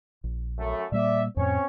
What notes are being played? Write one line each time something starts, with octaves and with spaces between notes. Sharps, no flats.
A#1
F#2 A3
A#2 G3 A#3 D5 E5
F2 A2 C4 C#4 C#5